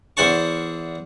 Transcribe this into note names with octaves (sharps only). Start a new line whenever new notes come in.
E2 C5 F#5 A5 C#6